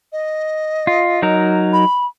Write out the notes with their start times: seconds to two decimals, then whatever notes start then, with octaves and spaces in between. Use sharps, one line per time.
0.12 D#5
0.87 F4
1.22 F#3 D#4 A#4
1.73 B5